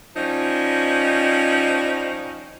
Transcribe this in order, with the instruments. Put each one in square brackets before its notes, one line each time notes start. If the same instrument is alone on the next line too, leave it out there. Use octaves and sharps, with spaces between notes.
[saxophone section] F3 G3 C#4 D#4